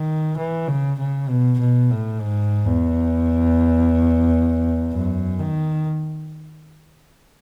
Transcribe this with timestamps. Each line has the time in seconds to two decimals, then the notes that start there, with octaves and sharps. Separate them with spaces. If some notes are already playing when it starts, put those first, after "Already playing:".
Already playing: D#3
0.37 E3
0.68 C#3
0.99 C#3
1.29 B2
1.59 B2
1.90 A2
2.21 G#2
2.65 E2
4.94 F#2
5.39 D#3